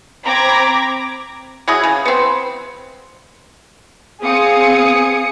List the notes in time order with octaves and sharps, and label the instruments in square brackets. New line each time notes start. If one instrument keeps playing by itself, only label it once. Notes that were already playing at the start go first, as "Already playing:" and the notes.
[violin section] C4 A#5 B5 D6 G#6 A#6
[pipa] F#3 E4 G#4
C#3
B3 C4
[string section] C4 D#6 C#7 [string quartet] G#4 F5 G#5